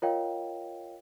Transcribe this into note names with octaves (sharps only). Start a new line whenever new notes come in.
F4 A#4 C#5 D#5 F5 G5